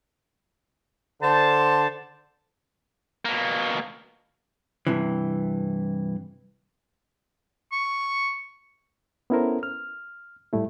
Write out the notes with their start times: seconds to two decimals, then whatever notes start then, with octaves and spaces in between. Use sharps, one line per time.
1.22 D3 C5 A5
3.25 B2 A#3
4.87 G2 C3 E3
7.72 C#6
9.30 B3 C#4 E4 A4 A#4 C5
9.63 F6
10.53 A2 G3 A3 E4